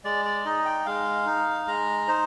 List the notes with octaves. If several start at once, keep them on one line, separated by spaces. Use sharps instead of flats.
G#3 D5
D5
D#4 D#5
G5
G#3 F5
D#4
G#3 A#5
D#4 C5